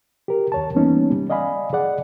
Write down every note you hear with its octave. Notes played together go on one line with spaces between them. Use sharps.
G4 A#4
D#2 C#5 A5
E3 G3 A#3 B3 C#4 D#4
G3
D5 D#5 F5 G#5 B5
G#4 D5 F#5